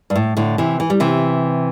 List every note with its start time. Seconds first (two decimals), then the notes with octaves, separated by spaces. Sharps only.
0.10 G2
0.15 A2
0.37 A2 D3
0.58 C3 E3
0.80 E3
0.90 G3
1.00 C3 E3